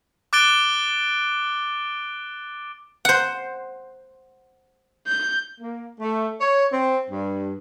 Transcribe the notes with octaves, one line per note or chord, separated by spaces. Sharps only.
D6 F#6 A6 D7 G7
C5 F#5
G6
A#3
A3
C#5
C4
G2